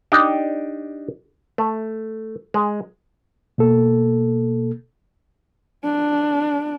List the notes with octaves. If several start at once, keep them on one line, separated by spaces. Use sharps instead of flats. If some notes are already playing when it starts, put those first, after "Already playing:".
D4 D#4 G4
A3
G#3
B2 A#3 A4
D4